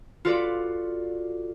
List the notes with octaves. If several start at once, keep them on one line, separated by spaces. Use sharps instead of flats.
F4 F#4 A4 B4 D5